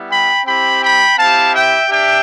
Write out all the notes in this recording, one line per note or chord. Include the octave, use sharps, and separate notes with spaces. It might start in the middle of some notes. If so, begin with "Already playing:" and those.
Already playing: G3 B3 E4
G5 B5
C4 E4 G4 G5 B5
G5 B5
C4 E4 G4 F5 A5
E5 G5
D4 G4 E5 G5